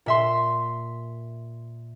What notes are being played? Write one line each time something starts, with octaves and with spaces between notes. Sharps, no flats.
A#2 E5 C6